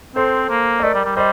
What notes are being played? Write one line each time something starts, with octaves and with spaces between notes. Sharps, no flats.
C4 A4 C5
A#3
D#5
A3 A#4 D5
G3
G3
G3 C5 D#5